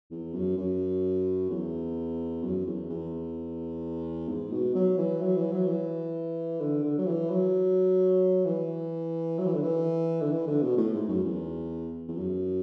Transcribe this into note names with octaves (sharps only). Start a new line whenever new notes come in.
E2
F#2
F#2
E2
F#2
E2
E2
G#2
B2
F#3
E3
F#3
E3
F#3
E3
D3
D3
F#3
E3
F#3
E3
F#3
E3
D3
E3
D3
E3
D3
B2
A2
G#2
F#2
E2
E2
F#2